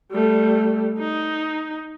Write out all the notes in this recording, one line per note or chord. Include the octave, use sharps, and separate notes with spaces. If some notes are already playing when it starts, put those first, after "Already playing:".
G3 A3
D#4